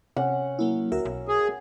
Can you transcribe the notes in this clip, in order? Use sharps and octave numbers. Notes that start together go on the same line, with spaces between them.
C3 C#4 F#5
F#3 A#3 E4
D2 F#4 A#4 E5
B1
G#4